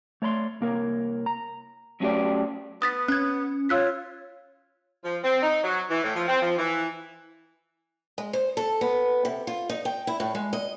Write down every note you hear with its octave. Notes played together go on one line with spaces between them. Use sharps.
A3 C#5 D5 B5 C6
C2 A#3 A#4 C#5
A#5
F#3 A3 C#4 F#4 G4 D5
B3 D#6 A6 B6
C#4 F#6 G#6
F4 C#5 E6 F#6 B6
F3
C4
D#4
F#3
E3
A2
F3
C4
F3
E3
G#3
C5
A4
B3
C3
F4
D#4
G5
E4
A2
G#3
D#5